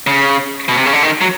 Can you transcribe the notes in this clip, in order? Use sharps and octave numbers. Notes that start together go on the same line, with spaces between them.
C#3
B2
C3
C#3
D3
D#3
F#3